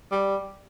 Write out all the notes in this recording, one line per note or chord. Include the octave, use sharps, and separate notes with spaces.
G3